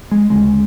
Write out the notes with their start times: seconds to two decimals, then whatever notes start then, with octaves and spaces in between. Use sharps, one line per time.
0.11 G#3
0.30 D2 C#3 G#3